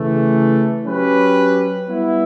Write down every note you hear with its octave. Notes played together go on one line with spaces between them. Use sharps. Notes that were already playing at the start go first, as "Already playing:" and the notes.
Already playing: C#3 E3 A3
F#3 C#4 G4 B4
G3 B3 E4